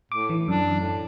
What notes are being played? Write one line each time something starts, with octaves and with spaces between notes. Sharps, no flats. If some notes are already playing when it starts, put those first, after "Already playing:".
A2 D6
E3
F#2 D4
A2